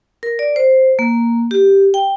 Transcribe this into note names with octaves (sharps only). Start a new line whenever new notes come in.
A#4
D5
C5
A#3
G4
G5